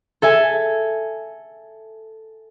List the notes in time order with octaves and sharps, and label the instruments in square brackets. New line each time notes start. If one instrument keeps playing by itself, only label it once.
[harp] A4 E5 G#5